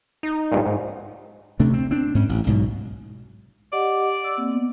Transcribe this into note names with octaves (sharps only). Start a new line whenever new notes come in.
D#4
C#2 G2 A#2
G#2
D2 C3 A3 D4
C4
C4 D4
G#2 C#4
A1
B1 G#2 B2
G4 D5 D#5 F#5
E6
A#3 C4
B3